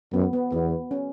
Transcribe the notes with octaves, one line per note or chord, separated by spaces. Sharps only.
F#2 B3
B3
E2 B3
C#4